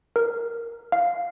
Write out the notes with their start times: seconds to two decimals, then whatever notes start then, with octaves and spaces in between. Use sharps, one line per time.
0.16 A#4
0.92 F5